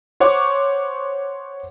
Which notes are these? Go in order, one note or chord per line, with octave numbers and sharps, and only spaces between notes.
C5 C#5 F#5 C#6 D6